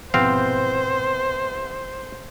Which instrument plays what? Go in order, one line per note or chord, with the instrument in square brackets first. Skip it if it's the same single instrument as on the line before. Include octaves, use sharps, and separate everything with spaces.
[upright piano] C2 B3 [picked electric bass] G#2 B2 F3 [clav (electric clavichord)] C4 F5 [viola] C5